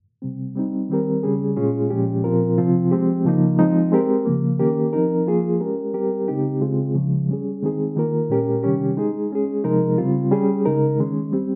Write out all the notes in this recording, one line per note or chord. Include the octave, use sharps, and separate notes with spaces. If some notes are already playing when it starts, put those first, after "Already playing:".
C3 G3 C4
G3 C4 D#4
D#3 G3 C4 G4 A#4
C#3 G3 C#4 G#4
A#2 G#3 C#4 F4 G#4
A#2 F3 G#3 C#4 G4
A#2 F3 C4 F4 A#4
C3 F3 C4 F4
F3 G#3 C4 G4
C#3 F3 A#3 D#4
F3 G#3 C4 D#4
G#3 C4 G4 A#4
C#3 F3 A#3
D#3 A#3 C#4 G4 A#4
F3 C4 D#4 A#4
F3 A#3 F4 G#4
G#3 C#4 G4 A#4
G3 C4 G4 A#4
C#3 G#3 C4 D#4 G4
C#3 G#3 C4 F4 G#4
C#3 F3 G#3
G3 C#4 G#4
D#3 G#3 C4 D#4 G#4
D#3 A#3 F4 A#4
A#2 G#3 C#4 G4 A#4
C3 D#3 G3 C#4 G4
G#3 D#4 G#4
G#3 C#4 G#4
C3 F3 G#3 D#4 A#4
C#3 G3 C4 F4
G3 C#4 G#4
C#3 G#3 D#4 A#4
D#3 G#3 C#4
G3 C4 G4